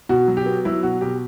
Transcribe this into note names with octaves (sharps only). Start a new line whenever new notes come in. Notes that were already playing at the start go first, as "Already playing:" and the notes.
B2 F#4
F#3
G4
B3
F#3 E4
B2 F#4
B2 G4